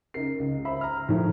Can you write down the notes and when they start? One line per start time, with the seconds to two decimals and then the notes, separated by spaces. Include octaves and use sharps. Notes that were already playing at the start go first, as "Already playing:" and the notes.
0.14 C#3 D#4 A#4 C7
0.39 C#2
0.65 C5 E5 B5
0.81 A#5 F6
1.09 A2 D#3 F3 D4